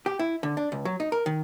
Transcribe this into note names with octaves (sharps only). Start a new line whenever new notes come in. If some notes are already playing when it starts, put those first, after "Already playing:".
G4
E4
D3
D4
C#2
F#3
D#4
A#4
D#3